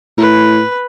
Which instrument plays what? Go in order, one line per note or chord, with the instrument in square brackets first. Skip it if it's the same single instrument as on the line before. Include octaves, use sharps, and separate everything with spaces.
[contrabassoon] A2 [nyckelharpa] B4